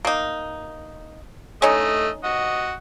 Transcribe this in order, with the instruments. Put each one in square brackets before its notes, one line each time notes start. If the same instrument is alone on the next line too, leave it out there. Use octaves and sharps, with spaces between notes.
[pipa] A#3 D#4
[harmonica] A3 D#5 [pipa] C#4 D#4
[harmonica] F#4 D#5 F#5